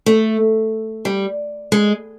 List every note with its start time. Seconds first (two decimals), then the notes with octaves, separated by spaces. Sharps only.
0.06 A3
1.05 G3
1.72 G#3